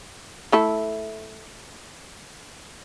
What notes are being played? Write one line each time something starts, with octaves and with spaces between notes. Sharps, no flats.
A3 E4 A4